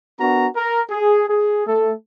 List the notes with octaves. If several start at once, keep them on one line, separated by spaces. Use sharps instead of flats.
B3 D4 F#4 A#4 A#5
A#4
G#4
G#4
A3 A4